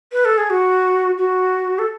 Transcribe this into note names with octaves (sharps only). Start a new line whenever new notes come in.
B4
A4
G#4
F#4
F#4
A4